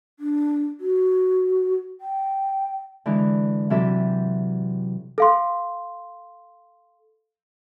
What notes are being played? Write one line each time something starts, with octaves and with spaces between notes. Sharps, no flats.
D4
F#4
G5
D3 E3 G#3
C3 E3 F#3 G4 A4 E5
A4 F5 C6